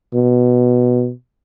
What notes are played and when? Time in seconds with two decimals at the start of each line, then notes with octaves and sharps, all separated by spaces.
0.14 B2